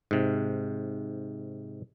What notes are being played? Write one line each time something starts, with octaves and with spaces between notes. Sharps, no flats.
G#2 C3